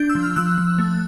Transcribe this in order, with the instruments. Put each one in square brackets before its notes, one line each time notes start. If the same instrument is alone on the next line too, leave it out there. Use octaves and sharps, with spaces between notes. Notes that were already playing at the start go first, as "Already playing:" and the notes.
Already playing: [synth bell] D4 G6
E6
F3
F6
F3 E6 F#6
F3
A3